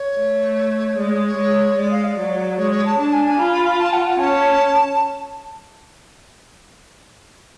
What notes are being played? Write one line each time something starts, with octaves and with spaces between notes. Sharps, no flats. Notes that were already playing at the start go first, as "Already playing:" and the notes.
Already playing: C#5
A3
G#3 D5
C#5
C#5
G#3
G#3 D5
F5
D5
F#3
G#3 C#5
C#5
A5
D4 A5
G#5
G#5
F4 B5
B5
B5
A5
F#5
F#5
C#4 A5